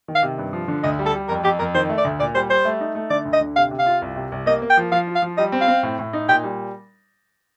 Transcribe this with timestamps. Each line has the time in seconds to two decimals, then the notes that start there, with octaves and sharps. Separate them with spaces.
0.08 D#3
0.15 F5
0.23 C3
0.38 G2
0.53 F3
0.68 D3
0.83 D2 D#5
0.99 G3
1.06 A4
1.14 G3
1.28 F2 A#4
1.43 F2 G4
1.59 F2 A#4
1.74 D#3 C5
1.90 A3
1.98 D5
2.05 D2
2.19 A#2 D5
2.35 G3 C5
2.50 G3 C5
2.65 A3
2.80 D#4
2.95 A3
3.10 D3 D5
3.26 D2
3.33 D#5
3.41 D3
3.56 C3 F5
3.71 C3
3.79 F5
3.86 F4
4.02 C2
4.16 C3
4.32 C2
4.46 A#3 D#5
4.62 A#3
4.70 G5
4.77 F3
4.92 F3 F5
5.07 F4
5.16 F5
5.22 F3
5.38 G3 D#5
5.52 C4
5.61 F5
5.68 C4
5.83 A2
5.99 A2
6.13 D#4
6.29 A#2 G5
6.44 G3